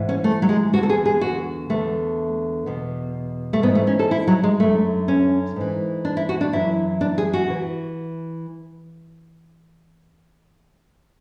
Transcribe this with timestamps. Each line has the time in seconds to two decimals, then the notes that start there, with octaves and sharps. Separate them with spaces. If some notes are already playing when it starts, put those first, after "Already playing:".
Already playing: G#2 E3
0.09 C#4
0.24 A3
0.42 F#3
0.49 G#3
0.73 E2 D3 F#4
0.83 A4
0.89 G#4
1.06 G#4
1.21 F#4
1.70 E2 D3 A3
2.66 E2 B2
3.53 A3
3.63 G#2 B3
3.67 E3
3.75 A3
3.87 C#4
3.99 A4
4.11 E4
4.27 F#3
4.44 G#3
4.60 F#2 D3 A3
5.08 C#4
5.56 G#2 E3
6.05 D4
6.17 E4
6.29 F#4
6.41 D4
6.53 F#2 E3 E4
7.01 D4
7.18 G#4
7.33 F#4
7.50 E3